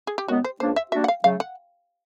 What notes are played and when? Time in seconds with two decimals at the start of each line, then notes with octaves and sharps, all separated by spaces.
0.07 G#4
0.18 G4
0.28 F#2 D#3 G#3 B3 F#4
0.44 C5
0.60 C#2 C#3 F3 A#3 D4 C5
0.76 E5
0.92 G3 A#3 D4 F#4 E5
1.04 F#5
1.08 F5
1.24 C#3 F#3 A3 F5
1.40 F#5